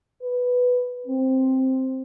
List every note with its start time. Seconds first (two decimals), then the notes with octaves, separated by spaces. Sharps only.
0.22 B4
1.07 C4